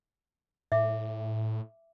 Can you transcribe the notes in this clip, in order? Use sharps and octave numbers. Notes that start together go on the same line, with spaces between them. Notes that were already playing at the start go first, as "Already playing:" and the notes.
A2 E5 D6